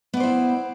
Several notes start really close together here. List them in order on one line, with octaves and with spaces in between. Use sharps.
B3 D5 C5 E4